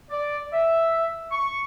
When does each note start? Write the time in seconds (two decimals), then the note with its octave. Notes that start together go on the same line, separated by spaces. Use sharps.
0.10 D5
0.53 E5
1.32 C#6